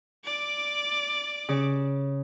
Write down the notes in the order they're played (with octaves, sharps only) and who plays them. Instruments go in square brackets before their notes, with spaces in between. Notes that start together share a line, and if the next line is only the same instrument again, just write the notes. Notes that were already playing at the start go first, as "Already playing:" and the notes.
[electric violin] D5 D6
[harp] C#3